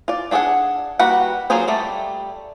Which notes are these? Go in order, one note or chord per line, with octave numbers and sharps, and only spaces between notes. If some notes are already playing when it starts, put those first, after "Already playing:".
F4 D5
D4 F#4 G#4 A4 F#5
G3 A#3 F#4 B4 F#5
F#3 A#3 F4 G#4 C5
G3 A3 D5